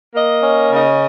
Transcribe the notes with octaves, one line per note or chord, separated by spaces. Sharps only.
A#3 D#5
C#4
C#3 D#5